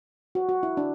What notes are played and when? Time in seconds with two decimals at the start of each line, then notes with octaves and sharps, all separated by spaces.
0.35 F#4
0.49 F#4
0.63 E4
0.77 D4